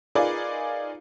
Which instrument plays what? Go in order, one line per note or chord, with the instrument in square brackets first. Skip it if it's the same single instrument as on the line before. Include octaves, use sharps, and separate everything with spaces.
[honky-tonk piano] D#4 F4 G#4 A#4 B4 D5